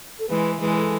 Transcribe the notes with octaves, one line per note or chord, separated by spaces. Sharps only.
A4
E3 G#3 B4
E3 G#3 B4
A4